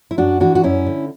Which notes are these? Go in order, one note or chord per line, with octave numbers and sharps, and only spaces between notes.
E4
F#2 D4 F#4
E3 D4 F#4
F#4
F#2 C#4 E4
D3